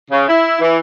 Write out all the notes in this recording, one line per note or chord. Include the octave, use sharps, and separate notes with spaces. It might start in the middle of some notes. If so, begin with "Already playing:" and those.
C#3
E4
E3